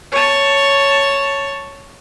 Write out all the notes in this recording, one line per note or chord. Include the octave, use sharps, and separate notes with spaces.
C#5 A5